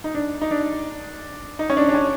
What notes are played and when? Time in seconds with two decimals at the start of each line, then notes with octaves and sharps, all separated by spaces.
0.04 D#4
0.14 D4
0.41 D#4
0.51 D4
1.59 D#4
1.70 C#4
1.77 D4
1.89 D4
1.94 C#4